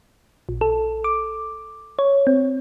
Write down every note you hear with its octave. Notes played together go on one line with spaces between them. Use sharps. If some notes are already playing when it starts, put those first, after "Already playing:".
A#1
A4
D6
C#5
C4